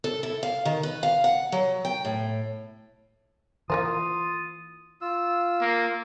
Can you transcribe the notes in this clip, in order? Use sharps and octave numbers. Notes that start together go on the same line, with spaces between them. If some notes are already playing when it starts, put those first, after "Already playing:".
A4
E4
F5
D#3
B4
F5
F#5
F#3
G5
A2
E3 A#3 F4 A#4 C5 D#6
F4 E6
A#3